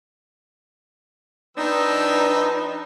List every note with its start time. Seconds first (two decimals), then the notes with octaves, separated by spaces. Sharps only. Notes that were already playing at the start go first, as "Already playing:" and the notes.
1.57 F3 D4 D#4 B4 G5 E6